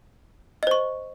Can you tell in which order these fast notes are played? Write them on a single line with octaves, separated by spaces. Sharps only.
D#5 C5 C#6